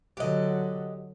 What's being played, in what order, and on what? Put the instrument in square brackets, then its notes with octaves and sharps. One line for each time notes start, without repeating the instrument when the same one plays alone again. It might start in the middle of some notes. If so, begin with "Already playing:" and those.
[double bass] D3 F#3 [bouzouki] G4 D#5